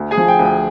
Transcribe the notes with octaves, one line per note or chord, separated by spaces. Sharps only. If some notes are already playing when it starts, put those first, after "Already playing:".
Already playing: D2
G#4 G#5
F3
G5
D2
G5